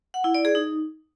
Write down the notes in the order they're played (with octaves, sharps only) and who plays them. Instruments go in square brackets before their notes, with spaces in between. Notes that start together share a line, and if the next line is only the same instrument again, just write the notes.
[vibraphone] F#5
E4
D5
G#4
D#4